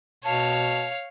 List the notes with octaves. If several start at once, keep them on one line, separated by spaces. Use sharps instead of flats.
B2 C#5 F5 A5